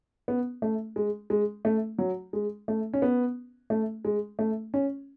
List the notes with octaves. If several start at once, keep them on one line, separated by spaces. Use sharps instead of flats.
B3
A3
G#3
G#3
A3
F#3
G#3
A3
C#4
B3
A3
G#3
A3
C#4